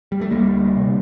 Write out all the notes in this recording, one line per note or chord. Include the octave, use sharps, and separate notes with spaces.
G3
A3
D2 G3 A#3
C3